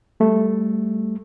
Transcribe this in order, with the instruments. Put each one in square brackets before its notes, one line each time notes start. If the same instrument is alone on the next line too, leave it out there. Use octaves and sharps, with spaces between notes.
[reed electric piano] G3 A3